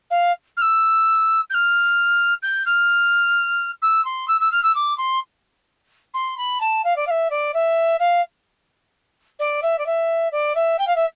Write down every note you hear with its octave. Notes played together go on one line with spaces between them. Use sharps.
F5
F6
E6
G6
F6
G6
F6
E6
C6
E6
E6
F6
E6
D6
C6
C6
B5
A5
F5
D5
F5
E5
D5
E5
F5
D5
E5
D5
E5
D5
E5
G5
F5
E5